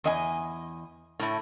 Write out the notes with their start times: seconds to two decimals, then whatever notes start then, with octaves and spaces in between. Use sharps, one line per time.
0.04 E2 D#5 G#5
1.19 A2 A3